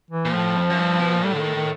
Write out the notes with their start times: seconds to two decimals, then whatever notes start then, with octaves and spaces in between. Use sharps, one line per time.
0.11 E3
0.25 A#2
0.33 A2 F3
0.56 F2
0.70 F#2
0.79 G2
0.99 B2
1.12 A#2
1.24 A2 G3
1.34 D3
1.39 D#3
1.55 D#3